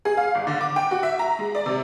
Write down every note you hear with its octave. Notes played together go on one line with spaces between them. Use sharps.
G#4
F5
G1
D3
D6
G5
F#4
E5
A#5
G#3
D5
C3